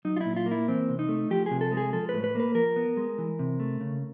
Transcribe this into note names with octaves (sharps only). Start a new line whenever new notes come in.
F#3 D#4
F4
A#2 E4
F4
A#3
E4
E3 C4
C3
D#4
A3
F3 G4
C3 G#4
A4
G#3
G#4
F3 A4
A2 B4
B4
A#3 B4
F3 A#4
B3
G#3
E3
C3
A3
C#3